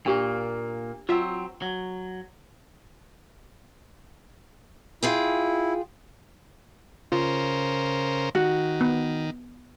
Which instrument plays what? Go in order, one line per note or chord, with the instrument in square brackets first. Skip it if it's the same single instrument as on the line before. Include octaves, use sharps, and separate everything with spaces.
[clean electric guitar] A#2 A#3 [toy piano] D4 G4
[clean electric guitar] F#3 C4 [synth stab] F4 E5
[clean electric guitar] F#3
[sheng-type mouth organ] E4 [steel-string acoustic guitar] F4 G#4 G5
[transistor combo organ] C#3 A#4 C5 [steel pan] F4
[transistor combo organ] D#3 [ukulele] F#4
[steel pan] B3